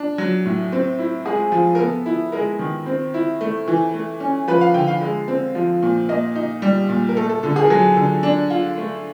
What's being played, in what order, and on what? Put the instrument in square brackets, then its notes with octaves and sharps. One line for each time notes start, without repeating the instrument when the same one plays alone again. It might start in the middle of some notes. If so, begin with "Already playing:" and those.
Already playing: [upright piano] D4
F#3
A2
C4
E4
G#3 G#4
F3
A#4
B3 A4
E4
G#3 A#4
D#3
C4
E4
A3
E3
A3
C#4
F3 B4
F5
D3 G5
F5
G#3
C4
F3
A#2
A#3 D#5
D#4
G3
A#2
A#4
A3 A4
A4
D3 A4
G#4
A#4
F#3 A4
D3 A4
D4
F4
A3